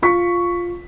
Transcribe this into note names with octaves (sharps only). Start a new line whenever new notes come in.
F4 C#6 B6